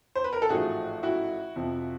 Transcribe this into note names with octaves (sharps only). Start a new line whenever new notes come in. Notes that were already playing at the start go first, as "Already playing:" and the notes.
C5
B4
A#4
A4
A1 G#2 F3 A3 F#4 G#4
E4 F#4
F2 C3 F3